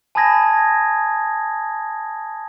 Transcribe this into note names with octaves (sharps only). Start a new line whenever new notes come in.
G#5 A5 B5 D#6 G#6 A#6